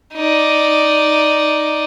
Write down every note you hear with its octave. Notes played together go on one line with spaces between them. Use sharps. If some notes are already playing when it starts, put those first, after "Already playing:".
D#4 D5